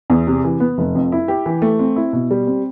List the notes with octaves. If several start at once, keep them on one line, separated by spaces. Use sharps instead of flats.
E2
C3
E3
B3
F1
F2
E4
G4
E3
A3
C4
E4
B2
G3
C4